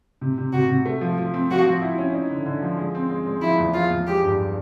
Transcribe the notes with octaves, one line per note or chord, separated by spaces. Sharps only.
C3
C3
C3 F#4
C3
A3
F3
F3
C4
F3 F#4
F3
E4
C#4
D#4
D3
D3
F3
G#3
C4
G#3
G#3
F3 E4
E2
F3 F4
E2
G#3 G4
G2